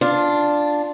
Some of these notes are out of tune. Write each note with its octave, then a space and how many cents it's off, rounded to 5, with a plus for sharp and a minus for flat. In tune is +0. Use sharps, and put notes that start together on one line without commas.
D4 +0 F4 +0